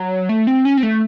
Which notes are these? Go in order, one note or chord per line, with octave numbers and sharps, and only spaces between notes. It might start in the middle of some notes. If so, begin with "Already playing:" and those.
Already playing: F#3
A3
C4
C#4
C4
A3